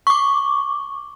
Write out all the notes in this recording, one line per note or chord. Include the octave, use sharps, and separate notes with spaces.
C#6 D6